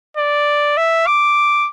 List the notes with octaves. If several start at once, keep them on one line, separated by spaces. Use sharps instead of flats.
D5
E5
D6